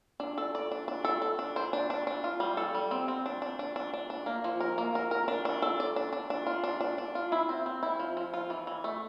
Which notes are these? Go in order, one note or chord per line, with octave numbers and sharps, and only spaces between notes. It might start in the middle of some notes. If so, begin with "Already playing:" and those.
D4
A4
D5
D4
D4
A4
A4
D4
C5
D4
D4
D4
F4
G3
A4
G3
C4
C4
D4
D4
D4
D4
D4
D4
A#3
F3
A#4
A#3
A#4
A#4
D4
D4
A4
D5
D4
D4
D4
F4
D4
D4
D4
F4
E4
C4
C4
E4
F3
F3
F4
E3
E3
A3